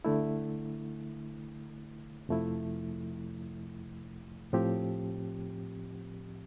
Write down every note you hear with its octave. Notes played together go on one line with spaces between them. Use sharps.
D3 A3 E4
F2 C3 F3 A3 E4
A2 F3 C4 G4